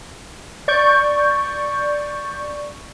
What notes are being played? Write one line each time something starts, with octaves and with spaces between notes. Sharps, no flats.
D5 C#6 G6